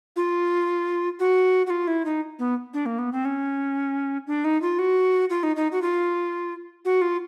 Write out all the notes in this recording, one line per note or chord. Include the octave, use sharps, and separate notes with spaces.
F4
F#4
F#4
F4
E4
D#4
B3
D4
A#3
B3
C4
C#4
D4
D#4
F4
F#4
F4
D#4
D#4
F#4
F4
F#4
F4